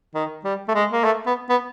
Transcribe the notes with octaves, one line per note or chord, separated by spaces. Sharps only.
D#3
G3
A3
G#3
A#3
A3
B3
B3